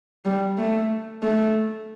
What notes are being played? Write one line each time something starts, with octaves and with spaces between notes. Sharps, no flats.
G3
A3
A3